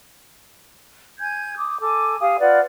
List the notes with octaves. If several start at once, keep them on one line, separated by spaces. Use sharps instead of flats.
G#5 G6 G#6
D6 D#6
A4 G#5 D6
G4 F5 G#5 D#6
F4 B4 D5 F#5